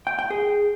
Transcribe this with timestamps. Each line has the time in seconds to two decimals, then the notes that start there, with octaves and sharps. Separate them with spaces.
0.07 G5
0.19 G5
0.30 G#4